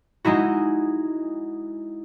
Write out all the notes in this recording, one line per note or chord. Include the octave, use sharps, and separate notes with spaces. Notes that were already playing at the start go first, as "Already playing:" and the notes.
G#3 D#4 E4 F#4